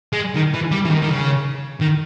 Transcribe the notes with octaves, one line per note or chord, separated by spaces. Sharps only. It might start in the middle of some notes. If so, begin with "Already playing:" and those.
G#3
D#3
E3
G3
E3
D#3
D#3
C#3
D#3